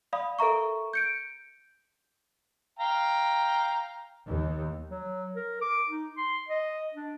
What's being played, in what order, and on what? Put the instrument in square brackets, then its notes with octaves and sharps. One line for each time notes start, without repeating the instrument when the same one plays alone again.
[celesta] D5 F5 B5 D#6
A4 A#4 E5 A#5 C#6
G6 C#7 D7
[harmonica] F5 G5 A#5
[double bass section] D#2
[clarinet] F#3
A#4
D6
D#4
C6
D#5
D4